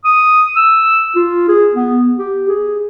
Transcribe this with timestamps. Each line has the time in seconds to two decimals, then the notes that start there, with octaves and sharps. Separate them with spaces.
0.04 D#6
0.56 E6
1.16 F4
1.48 G#4
1.74 B3
2.18 G4
2.49 G#4